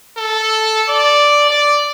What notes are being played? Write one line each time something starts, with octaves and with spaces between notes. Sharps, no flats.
A4
D5
D5